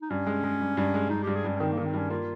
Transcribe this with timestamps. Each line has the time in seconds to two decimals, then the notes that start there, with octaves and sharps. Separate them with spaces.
0.02 D#4
0.10 G2 C#4
0.27 G#3
0.44 G#3
0.61 G2
0.77 G2
0.94 G#3
1.10 G2 D#4
1.23 G2 G4
1.36 G#4
1.44 G2 C#4
1.56 C#4
1.60 D#3 C4
1.72 A#3
1.78 D#3
1.85 C4
1.93 G2 C#4
2.10 A#3 F4